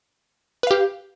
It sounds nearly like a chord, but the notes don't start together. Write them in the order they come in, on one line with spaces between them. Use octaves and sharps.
B4 F5 G4